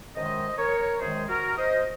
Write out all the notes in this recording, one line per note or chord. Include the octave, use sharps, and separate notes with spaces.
F#2 D#3 G#3 C5 D#5
A#4 C#5
F#2 D#3 G#3 G#4 C5
F#4 A#4
C5 D#5